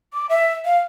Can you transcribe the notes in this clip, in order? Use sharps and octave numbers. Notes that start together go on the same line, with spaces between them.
D6
E5
F5